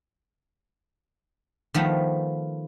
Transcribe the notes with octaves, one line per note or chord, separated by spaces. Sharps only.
D#3 F3 A3 B3